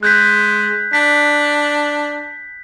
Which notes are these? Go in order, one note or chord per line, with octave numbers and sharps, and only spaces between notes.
G#3 F#6 G6 B6
D4 B6